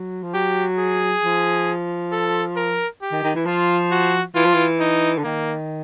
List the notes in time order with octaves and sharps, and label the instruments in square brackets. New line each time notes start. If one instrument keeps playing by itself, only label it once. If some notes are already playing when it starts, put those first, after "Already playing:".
Already playing: [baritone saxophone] F#3
F3
[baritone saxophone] F#3 [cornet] G4
[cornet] G#4
[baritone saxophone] F3
[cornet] A4
A#4
G4
[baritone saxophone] D#3
D#3
E3
[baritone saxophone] F3 [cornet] F4
[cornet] F#4
[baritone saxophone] E3 [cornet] F4
[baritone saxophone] F3
E3
[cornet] D#4
[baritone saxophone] D3
[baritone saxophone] D#3 [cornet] A#3